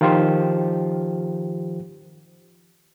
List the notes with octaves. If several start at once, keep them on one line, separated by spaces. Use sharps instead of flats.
D#3 F3 F4 G4 C5